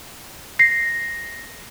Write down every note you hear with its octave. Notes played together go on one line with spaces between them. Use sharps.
A#6 C7